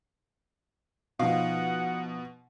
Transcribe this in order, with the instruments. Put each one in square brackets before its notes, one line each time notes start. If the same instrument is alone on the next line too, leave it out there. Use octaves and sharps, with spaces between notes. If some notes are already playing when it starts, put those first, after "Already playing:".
[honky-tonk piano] B2 [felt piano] F3 D#4 [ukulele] F5 [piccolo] F#5